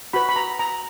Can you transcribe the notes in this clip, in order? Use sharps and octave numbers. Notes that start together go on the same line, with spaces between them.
F#4 B4 B5
B5
A#5
A#5